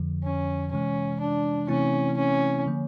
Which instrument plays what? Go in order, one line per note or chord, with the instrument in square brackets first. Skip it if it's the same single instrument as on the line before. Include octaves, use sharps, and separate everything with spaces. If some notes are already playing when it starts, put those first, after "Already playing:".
Already playing: [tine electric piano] F2 D3 F3
[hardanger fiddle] C#4
[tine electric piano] C3 E3 G#3 [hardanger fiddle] C#4
[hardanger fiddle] D4
[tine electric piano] C3 E3 A3 C4 E4 [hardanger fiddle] C#4
[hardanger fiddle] C#4
[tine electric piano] D3 F3 A#3